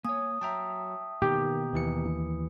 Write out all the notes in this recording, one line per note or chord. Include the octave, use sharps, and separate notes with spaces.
A#3 C#5 G#5 D#6
F#3 E5 G5 A5 A#5
B2 D#3 A#3 G4
D#2 E3 C#7